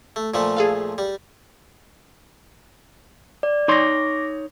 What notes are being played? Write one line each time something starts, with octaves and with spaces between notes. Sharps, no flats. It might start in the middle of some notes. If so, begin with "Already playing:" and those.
A3
A#2 F3 A3
G#4 A4 F5
G3
D5
D#4 C#5 C6 D6 A#6